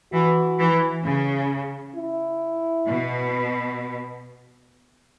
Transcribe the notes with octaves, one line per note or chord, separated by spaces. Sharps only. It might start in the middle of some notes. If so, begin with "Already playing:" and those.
E3 F#4
E3
C#3
E4
B2